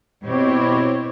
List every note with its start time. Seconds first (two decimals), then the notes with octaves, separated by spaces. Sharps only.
0.24 B2 B3 C4 E4 G4 C#5